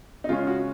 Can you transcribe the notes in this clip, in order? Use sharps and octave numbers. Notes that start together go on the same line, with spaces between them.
D#4
C#3 G#3 C#4 F4
F#4